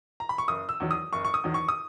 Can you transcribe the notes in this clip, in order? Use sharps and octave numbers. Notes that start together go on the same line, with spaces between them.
A#5
B5
C#6
F#1 D#6
E6
E2 D#3 F#3
D#6
F#1 C#6
C#6
D#6
E2 D#3 F#3
C#6
D#6